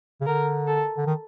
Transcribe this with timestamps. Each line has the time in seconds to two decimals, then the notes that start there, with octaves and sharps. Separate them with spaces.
0.21 C#3
0.26 D3 A#4
0.67 A4
0.97 D3
1.06 D#3